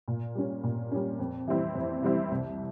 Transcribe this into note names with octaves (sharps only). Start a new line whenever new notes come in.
A#2
G3 C#4
A#2
G3 C#4
F2
E3 G3 C4 E4
F2
E3 G3 C4 E4
C2